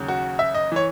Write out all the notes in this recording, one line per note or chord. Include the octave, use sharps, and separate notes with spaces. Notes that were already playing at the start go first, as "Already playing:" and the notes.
Already playing: D#2 C#3 F#3
F#4
E5
D#5
E3 C#5